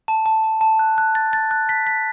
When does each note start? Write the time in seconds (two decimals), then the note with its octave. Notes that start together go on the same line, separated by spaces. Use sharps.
0.08 A5
0.26 A5
0.44 A5
0.61 A5
0.79 F#6
0.98 F#6
1.15 A6
1.33 A6
1.51 F#6
1.69 B6
1.87 B6